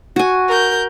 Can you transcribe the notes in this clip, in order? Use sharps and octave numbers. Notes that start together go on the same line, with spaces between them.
F#4 G#5
A#4 G6